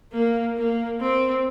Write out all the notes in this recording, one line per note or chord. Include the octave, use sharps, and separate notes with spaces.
A#3
A#3
C4